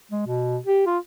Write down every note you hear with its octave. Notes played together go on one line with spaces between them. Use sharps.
G#3
B2
G4
F4